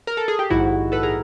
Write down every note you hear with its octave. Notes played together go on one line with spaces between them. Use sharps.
A#4
A4
G#4
G4
A#1 G#2 D#3 E4 F#4
A4 B4
G#4 A#4